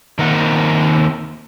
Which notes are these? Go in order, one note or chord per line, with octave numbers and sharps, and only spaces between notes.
D#3 A#3 C4 F#5